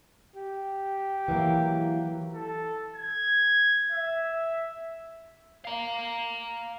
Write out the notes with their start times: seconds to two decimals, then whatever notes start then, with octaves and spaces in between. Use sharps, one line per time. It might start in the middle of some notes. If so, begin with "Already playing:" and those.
0.36 G4
1.28 E3 F#3 A#3
2.34 A4
2.95 G#6
3.92 E5
5.65 F5 A#5